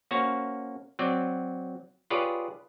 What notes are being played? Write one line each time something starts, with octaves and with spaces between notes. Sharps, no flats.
A#3 C#4 F#4 C5
F#3 C4 D5
F4 G4 G#4 B4 C#5 D5